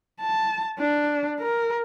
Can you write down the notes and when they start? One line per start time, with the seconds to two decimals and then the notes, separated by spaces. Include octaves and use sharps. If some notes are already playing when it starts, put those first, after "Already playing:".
0.21 A5
0.79 D4
1.40 A#4